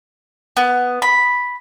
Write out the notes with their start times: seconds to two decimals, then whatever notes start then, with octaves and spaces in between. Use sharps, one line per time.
0.57 B3
1.02 B5